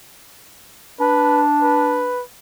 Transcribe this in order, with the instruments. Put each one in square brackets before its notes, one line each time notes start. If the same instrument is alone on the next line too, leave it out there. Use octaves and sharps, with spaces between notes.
[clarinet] D4 [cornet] B4
[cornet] B4